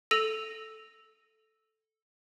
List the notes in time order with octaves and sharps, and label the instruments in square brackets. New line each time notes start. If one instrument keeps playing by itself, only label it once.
[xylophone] A4 E6 A#6 D#7 F7